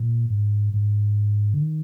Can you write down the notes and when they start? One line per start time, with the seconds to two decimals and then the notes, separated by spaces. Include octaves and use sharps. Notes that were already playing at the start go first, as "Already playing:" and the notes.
Already playing: A#2
0.30 G#2
0.74 G#2
1.54 D3
1.62 D#3